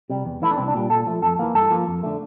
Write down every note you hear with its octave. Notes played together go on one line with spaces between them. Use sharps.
C3 G3
E2
E3 A3 E4
D4
C2 C4
D4
A#2 G3
A#2 A4
F3 A3
F2 A4
E3 A#3
G2 A4
F3 A#3
F2
D3 A3